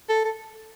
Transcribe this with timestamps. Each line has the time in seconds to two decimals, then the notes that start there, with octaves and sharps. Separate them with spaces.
0.09 A4
0.25 A4